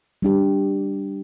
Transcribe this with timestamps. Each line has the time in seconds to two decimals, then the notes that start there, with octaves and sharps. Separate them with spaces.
0.22 G3 D4 G4